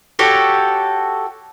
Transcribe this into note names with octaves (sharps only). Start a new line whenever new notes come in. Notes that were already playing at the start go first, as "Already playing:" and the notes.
F#4 G4 A4 C#5